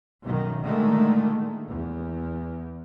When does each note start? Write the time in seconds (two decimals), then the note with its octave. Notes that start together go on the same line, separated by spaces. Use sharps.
0.24 B1 F#2 D#3
0.64 A#2 D3 D#3 G#3 A3
1.69 E2